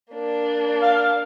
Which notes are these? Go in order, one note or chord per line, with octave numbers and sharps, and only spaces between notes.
A#3 D4
F5